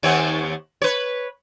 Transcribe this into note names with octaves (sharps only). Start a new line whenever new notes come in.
D#2 C4 C#5
B4 C#5